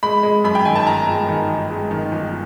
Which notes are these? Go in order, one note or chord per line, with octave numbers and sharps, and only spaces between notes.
G#3 B5
G#3
F#2 B5
G5
D#3 G#5
A5
G1 A#5
G#3
D#3
G1
G#3
D#3
G1